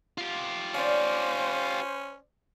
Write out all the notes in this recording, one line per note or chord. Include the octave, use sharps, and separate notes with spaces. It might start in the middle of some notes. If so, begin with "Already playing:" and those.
F4 G4
C#4 C5 D5 F5